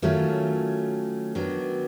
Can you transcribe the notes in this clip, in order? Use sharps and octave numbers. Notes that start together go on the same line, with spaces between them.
D#3 F#3 A3 C#4 F4
D#3 F#3 B3 D4